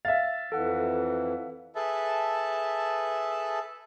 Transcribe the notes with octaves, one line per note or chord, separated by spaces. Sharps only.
E5 F5 A6
F2 E3 A4 F#5
G#4 A4 B4 E5 A5